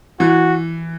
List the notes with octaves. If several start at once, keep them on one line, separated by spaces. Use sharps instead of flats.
E3 F#4